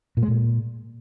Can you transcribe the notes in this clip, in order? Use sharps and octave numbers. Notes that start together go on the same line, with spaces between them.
A#2
G#3
A#2